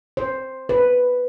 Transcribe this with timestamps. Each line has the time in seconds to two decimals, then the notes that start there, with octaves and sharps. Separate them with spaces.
0.17 C5
0.69 B4